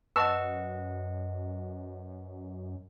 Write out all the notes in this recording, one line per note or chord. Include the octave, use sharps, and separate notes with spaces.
F#2 B4 D#5 F#5 A5 C#6 E6